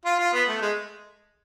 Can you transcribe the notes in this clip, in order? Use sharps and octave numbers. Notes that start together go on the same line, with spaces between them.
F4
F4
B3
A3
G#3